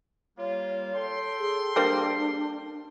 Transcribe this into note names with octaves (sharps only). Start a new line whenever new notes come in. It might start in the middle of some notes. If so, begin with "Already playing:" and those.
G3 A#3 F4 C#5
A4 G5 C6
G#4
G3 A#3 D4 C5